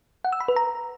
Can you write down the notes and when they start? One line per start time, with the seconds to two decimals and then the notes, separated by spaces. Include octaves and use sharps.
0.25 F#5
0.32 E6
0.40 B5
0.48 B4
0.56 A#5